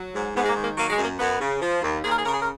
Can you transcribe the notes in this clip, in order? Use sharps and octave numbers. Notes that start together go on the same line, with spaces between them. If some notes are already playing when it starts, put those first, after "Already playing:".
Already playing: F#3
G#2
G#2 B3
G#3
A#3
D#3
A#3
F#3 A#3
G#3
F#2 A#3
F#2 B3
C#3
F3
D#2
D#2 G#4
A#4
G#4
C#3 A#4
G#4
A#4